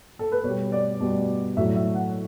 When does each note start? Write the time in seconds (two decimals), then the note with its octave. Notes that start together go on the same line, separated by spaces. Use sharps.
0.19 A4
0.32 B4
0.43 B2 C#5
0.48 G3
0.72 D5
1.00 B2 G3
1.57 A2 F#3 E5
1.76 E5
1.94 F#5